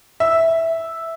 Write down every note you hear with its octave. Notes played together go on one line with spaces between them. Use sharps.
E5